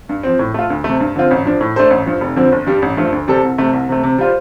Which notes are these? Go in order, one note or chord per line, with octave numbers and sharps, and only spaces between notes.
G2
F3 C4
A2
A3 F4
D2
C3 A3
G2
D3 F3 C4 F4
A1
G2 F3 D4
A2
A3 D4 A4 C5
A1
G2 F3
F1
F2 D3 F3 C4
G1
G2 G3 D4
A1
G2 F3 A3
D2
C3 G3 C4 A4
C2
C3 A3
C2
C3 A3
C3
G3 F4 C5